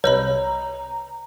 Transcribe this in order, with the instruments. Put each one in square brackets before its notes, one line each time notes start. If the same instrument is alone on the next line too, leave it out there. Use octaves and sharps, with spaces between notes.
[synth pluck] C2 C3 [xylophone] B4 D#5 B5 [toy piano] C#5 [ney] A#5